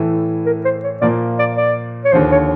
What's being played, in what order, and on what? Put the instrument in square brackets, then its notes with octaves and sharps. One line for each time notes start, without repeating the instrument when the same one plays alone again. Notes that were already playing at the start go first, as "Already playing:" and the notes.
Already playing: [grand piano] A2 E3 A3
[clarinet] A#4
C5
C#5
[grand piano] A#2 F3 A#3 [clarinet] D5
[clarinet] D5
D5
C#5
[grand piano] D#2 D3 F3 [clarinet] C5
[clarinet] C#5